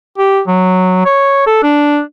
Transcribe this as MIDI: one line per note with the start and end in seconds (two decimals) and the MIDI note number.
0.18 0.41 67
0.48 1.05 54
1.05 1.46 73
1.47 1.61 69
1.63 2.00 62